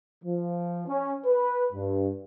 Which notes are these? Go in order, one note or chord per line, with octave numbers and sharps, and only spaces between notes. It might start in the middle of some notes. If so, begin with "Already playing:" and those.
F3
C#4
B4
G2